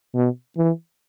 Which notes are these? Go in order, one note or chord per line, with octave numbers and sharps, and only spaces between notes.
B2
E3